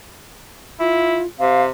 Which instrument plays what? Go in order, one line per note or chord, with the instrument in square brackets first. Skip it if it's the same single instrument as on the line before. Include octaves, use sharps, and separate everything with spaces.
[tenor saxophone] E4 [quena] F4
[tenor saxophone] C3 [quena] F5